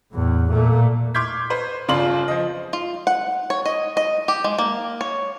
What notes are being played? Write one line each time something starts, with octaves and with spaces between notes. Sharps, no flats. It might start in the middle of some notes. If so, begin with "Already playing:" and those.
E2 A2
A#2 A3
C6 D6 F6 G6 G#6 B6
B4 C5
G1 C#3 F4 D5 C6 F#7
F3 D#5
F4
F#5
C#5
D#5
D#5
G4
G#3
A#3
C#5